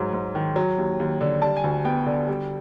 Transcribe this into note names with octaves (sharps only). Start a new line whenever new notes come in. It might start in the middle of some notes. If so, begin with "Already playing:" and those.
Already playing: G#2 F#3
G#2
D#3
F#3
D#2
D#2
D3
G3 A5
G#5
D2
B3 G5
D3
G3